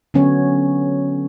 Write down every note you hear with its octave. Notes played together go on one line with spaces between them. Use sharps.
D3 F#3 B3 C#4 C#5